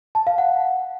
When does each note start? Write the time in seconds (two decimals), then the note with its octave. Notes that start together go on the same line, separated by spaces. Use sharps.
0.15 A5
0.27 F5
0.38 F#5